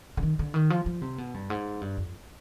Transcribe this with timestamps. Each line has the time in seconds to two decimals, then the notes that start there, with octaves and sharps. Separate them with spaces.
0.17 D3
0.23 D#3
0.39 D3
0.54 D#3
0.70 F3
0.86 F3
1.02 C3
1.18 B2
1.34 G2
1.50 G#2
1.81 G2
1.97 F2